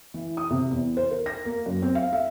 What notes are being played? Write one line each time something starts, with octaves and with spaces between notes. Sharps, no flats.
E3
D#6
C3
E2
C5
A#4
A#6
A#3
F#2
C4
F5
E5